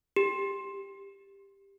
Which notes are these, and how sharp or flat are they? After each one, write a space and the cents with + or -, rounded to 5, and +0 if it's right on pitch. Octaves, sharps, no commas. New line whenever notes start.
G4 +15